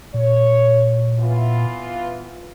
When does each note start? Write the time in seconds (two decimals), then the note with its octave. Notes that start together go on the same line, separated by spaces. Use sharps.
0.14 A#2 C#5
1.20 E3 B3 F4